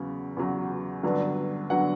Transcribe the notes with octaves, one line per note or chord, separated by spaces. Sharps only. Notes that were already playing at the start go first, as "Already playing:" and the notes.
Already playing: E2 C#3 F#3
E2 C#3 F#3
G2 D3 F#3 B3 D4
D3 F#3 B3 D4 F#5